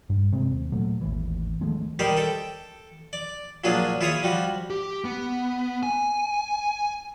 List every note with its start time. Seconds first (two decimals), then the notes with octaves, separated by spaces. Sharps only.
0.10 G2
0.32 C3 G#3 C4
0.51 D#2
0.72 A#2 F#3 A3
1.01 G#1 D#2 A2 E3
1.61 D#3 F3 G#3 A3
1.99 D#3 G3 G4 A#4 C5
2.17 A4 G5
3.13 D5
3.64 A#2 F3 F#3 D4 F4 G#4
4.01 E4 F4 G#4 C#5 E5 D#6
4.23 F3 G3 F#4
4.70 G4
5.05 B3
5.83 G#5